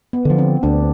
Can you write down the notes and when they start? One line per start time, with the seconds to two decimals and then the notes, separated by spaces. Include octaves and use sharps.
0.13 B3
0.25 D3 F3
0.38 C4
0.63 D2 D4